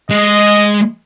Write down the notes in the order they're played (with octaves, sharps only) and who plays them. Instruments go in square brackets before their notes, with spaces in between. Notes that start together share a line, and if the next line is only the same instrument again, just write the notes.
[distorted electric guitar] G#3 [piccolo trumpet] D#5